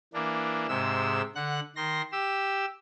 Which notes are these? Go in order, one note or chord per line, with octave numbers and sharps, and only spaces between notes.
E3 A#3 D4
G#2 C3 G#3 E6
D3 F#5 F#6
D#3 C6 A#6
G4 E6